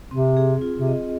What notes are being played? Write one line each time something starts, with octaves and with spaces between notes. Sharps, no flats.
C3 C4
G#4
F4
C3
D#5